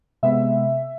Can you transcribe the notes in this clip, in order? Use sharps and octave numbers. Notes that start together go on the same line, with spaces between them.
C3 G#3 B3 E5